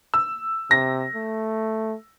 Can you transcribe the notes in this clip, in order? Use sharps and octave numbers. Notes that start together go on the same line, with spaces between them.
E6
C3 A#6
A3